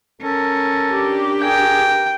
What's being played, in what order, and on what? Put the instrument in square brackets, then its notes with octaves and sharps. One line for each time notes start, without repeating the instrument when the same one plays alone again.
[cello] C#4 A#4 [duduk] A4
[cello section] D4 G4
[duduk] G#4 [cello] A#4 [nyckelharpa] G5